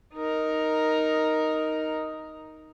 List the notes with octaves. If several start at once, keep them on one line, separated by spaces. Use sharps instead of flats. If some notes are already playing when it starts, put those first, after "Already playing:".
D#4 A#4